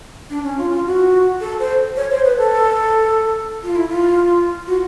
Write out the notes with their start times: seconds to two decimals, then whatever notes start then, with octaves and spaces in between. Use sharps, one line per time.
0.30 D4
0.44 C#4
0.57 F4
0.72 F4
0.86 F#4
1.41 A4
1.60 C5
1.97 C#5
2.10 C5
2.24 B4
2.38 A4
3.63 F4
3.76 E4
3.89 F4
4.67 F#4